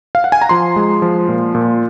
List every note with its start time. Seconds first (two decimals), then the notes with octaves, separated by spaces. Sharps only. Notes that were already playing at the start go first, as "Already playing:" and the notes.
0.15 F5
0.24 F#5
0.32 G#5
0.42 A#5
0.49 F3 C6
0.76 G#3
1.02 F3
1.28 A#2
1.55 A#2